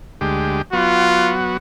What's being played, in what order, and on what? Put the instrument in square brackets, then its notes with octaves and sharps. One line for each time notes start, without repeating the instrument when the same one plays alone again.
[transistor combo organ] D2 G#3 G4
[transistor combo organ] F#3 B3 F#4 [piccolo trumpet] F4